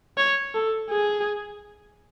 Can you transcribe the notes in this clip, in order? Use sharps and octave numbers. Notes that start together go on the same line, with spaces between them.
C#5
A4
G#4